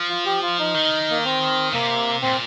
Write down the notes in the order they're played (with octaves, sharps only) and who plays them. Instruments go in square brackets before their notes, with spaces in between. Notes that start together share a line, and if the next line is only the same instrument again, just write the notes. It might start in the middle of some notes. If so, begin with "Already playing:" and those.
Already playing: [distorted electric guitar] F3
[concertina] F4
G4
F4
D#4
[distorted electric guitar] D#3
[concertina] A#3
C4
[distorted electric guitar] C3 [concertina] A#3
[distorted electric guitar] A#2 [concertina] C4